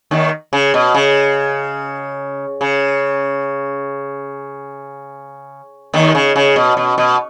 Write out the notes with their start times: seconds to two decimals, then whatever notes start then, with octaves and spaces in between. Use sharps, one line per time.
0.11 D#2 D#3
0.53 C#3
0.74 B2
0.94 C#3
2.61 C#3
5.94 D#2 D#3
6.15 C#3
6.36 C#3
6.56 B2
6.77 B2
6.98 B2